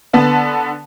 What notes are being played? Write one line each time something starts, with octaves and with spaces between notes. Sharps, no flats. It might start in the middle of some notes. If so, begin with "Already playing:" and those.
D3 B3 A5